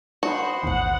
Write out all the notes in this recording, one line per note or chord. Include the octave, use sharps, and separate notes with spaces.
F#4 C5 B5 D#6
A1 D#2 F#5